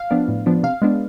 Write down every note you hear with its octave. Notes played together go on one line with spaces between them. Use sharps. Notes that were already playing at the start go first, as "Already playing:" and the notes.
Already playing: F5
F3 B3 D4
A2
F3 B3 D4
C3 F5
G#3 B3 D4